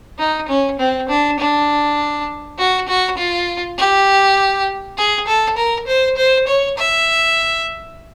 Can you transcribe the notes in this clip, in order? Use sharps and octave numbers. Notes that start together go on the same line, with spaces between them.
D#4
C#4
C4
D4
D4
F#4
F#4
F4
G4
G#4
A4
A#4
C5
C5
C#5
E5